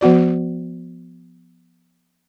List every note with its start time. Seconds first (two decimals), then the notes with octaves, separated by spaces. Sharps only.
0.01 F3 B3 F#4 D5